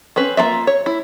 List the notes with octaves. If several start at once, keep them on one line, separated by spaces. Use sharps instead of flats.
C4 C#4 B4
A#3 D4 F4 E5
C#5
E4